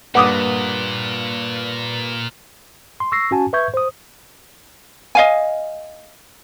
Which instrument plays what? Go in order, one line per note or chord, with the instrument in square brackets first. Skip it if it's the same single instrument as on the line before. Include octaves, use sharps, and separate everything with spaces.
[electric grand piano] G2 A#3 B4 [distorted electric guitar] A#2 [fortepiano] F#5 D6 D#6
[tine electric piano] C6
C#6 E6 A#6 C7
C#4 F#4 G#5 A5
B4 E5 C#6 G6 G#6
C5 D#6
[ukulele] D#5 F5 G#5